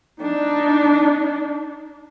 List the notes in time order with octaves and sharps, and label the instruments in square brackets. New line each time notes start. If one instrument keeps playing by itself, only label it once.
[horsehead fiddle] D4 D#4